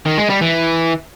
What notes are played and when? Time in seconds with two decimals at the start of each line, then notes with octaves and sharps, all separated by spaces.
0.06 D#3
0.18 G#3
0.30 G3
0.42 E3